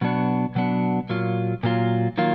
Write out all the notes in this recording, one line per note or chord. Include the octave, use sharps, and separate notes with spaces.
B2 F#3 B3 D4 F#4
B2 F#3 B3 D4 F#4
A#2 F#3 A#3 F4
A#2 F#3 A#3 F4
D#3 F#3 A#3 F4